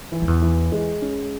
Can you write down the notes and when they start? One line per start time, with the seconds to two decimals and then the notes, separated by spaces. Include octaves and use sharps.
0.12 E3
0.22 F2
0.28 E2
0.42 E3
0.72 G#3
1.02 C#4